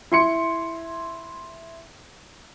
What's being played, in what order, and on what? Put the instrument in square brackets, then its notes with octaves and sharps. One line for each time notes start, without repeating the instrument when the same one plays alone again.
[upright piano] E4 C6 C#7